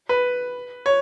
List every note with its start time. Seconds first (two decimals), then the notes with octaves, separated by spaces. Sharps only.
0.09 B4
0.86 C#5